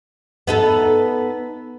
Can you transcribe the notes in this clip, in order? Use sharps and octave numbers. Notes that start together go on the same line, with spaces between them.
B3 D#4 A4